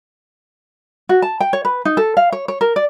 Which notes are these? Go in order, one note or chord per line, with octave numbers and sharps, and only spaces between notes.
F#4
A5
G5
C#5
B4
D#4
A4
F5
C#5
C#5
A#4
D5